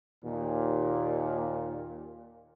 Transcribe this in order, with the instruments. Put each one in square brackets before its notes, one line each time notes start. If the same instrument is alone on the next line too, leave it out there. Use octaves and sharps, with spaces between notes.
[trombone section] D#2 A#2